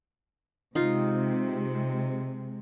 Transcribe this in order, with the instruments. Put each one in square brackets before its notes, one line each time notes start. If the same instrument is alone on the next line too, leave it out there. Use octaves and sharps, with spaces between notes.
[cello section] C3 G#3 [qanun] D#4 F4